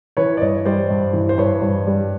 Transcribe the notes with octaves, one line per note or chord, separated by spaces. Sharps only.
E3 B4 C#5
D5
G2 C#5 D#5
G3 C5 D5
G2
E3
C5
G2 B4 C#5
G2
G3